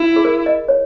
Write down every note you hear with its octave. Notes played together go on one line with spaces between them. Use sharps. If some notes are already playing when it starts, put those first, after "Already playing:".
Already playing: E4
G#4
A#4
D#5
C#5